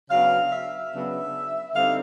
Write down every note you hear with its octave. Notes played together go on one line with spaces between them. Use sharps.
C#3 F#3 B3 D4 F5
E5
C#3 F#3 B3 D4
D3 G3 C4 D#4 F5